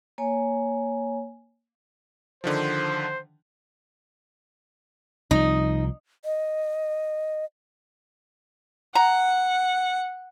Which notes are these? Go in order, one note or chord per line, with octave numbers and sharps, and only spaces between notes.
A#3 C#5 G#5
D3 D#3 F3 C5
C2 F3 D#4
D#5
F#5 A#5